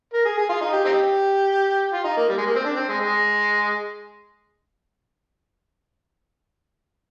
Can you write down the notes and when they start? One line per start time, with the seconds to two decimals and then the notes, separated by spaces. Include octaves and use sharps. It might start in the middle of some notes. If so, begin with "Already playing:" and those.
0.14 A#4
0.25 G#4
0.37 G#4
0.49 F4
0.61 D#4
0.73 G4
0.85 C4 D#4 G4
1.93 F4
2.05 D#4
2.17 A#3
2.29 G3
2.38 G#3
2.46 A#3
2.55 C4
2.65 D4
2.77 C4
2.89 G#3
3.00 G#3